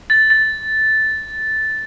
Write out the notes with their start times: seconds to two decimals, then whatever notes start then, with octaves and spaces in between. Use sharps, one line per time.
0.10 A6
0.30 A6